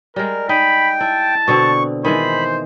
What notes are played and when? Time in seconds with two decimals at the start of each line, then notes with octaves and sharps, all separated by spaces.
0.16 G3 G#3 A#4
0.49 D#4 G5 B5
1.01 E4 A5
1.48 B2 D3 C4 C#6
2.05 D#3 E3 G#3 C5 B5